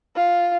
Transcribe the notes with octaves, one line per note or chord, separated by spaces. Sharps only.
F4